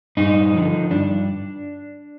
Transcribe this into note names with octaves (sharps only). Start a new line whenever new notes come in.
G2 D#4
D3 F3
G2 D4